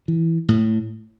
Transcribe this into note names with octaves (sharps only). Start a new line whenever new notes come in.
E3
A2